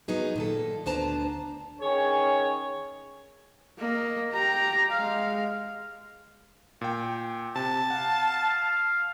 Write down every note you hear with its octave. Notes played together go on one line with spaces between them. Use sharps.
F#3 B3 D#4 G#4
A#2 D#3 A4
D2 B3 D4 C5 A5 A#5
D#3 C#4 G#4 C#5
A#3 D#5
G4 A#5
G#3 F5
A#2 G5
C3 A5
F5 F#5